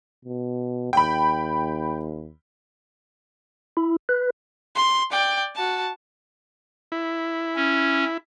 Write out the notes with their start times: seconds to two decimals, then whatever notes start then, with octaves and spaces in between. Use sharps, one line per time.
0.25 B2
0.93 D#2 G5 B5
3.77 E4
4.09 B4
4.75 C6
5.11 D5 G5
5.55 F#4 A5
6.92 E4
7.56 C#4